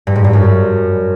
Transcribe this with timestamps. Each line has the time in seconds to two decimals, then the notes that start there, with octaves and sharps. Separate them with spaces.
0.07 G2
0.16 G#2
0.24 G2
0.33 F#2